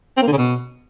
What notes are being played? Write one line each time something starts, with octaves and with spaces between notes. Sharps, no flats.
C4
A#3
D3
C#3
B2